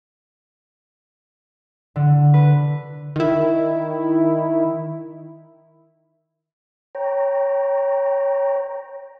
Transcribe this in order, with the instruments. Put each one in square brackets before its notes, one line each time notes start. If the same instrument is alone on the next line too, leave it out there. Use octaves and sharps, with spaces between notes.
[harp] D3
B4
[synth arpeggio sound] D#3 E4
[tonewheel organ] C#5 G5 A#5